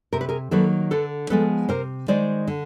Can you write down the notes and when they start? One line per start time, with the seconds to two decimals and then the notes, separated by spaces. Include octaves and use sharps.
0.13 C3 A#4
0.21 B4
0.29 G#4 A#4
0.51 D#3 F#3 A#3 A4 B4
0.91 D3 A4 B4
1.30 F3 G#3 B3 A4 B4
1.69 C3 A#4 C5
2.08 D#3 G#3 C5 D5
2.47 D3